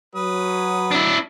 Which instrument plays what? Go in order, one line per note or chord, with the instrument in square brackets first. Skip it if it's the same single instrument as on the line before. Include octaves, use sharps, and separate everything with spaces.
[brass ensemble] F#3 [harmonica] B4 D#6
[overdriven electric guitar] D4 E4